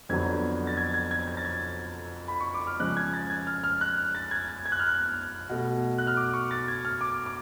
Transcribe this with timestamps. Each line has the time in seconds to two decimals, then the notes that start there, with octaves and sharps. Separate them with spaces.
0.09 F2 D3 F#3 B3 G#6
0.67 A6
0.77 G#6
0.94 G#6
1.11 G#6
1.28 G#6
1.37 A6
1.44 G#6
2.28 B5
2.40 C#6
2.54 D6
2.67 F6
2.80 C#3 F3 G#3 F#6
2.97 G#6
3.14 A6
3.30 G#6
3.47 F6
3.64 F6
3.81 F#6
4.15 A6
4.31 G#6
4.48 G#6
4.66 G#6
4.72 F#6
4.79 F6
4.86 F#6
5.50 B2 A3
5.98 F#6
6.07 F6
6.17 D6
6.34 C#6
6.51 A6
6.68 G#6
6.85 F6
7.01 D6
7.26 D6